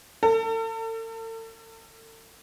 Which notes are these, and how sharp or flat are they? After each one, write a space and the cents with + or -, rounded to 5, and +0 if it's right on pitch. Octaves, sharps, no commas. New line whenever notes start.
A4 +35